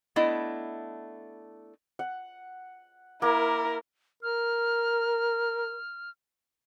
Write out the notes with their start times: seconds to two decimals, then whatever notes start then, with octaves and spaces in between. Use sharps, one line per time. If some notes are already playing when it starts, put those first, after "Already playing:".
0.16 A3 B3 D4 E4 D#5
1.99 F#5
3.22 A#3 E4 A#4
4.23 A#4 F6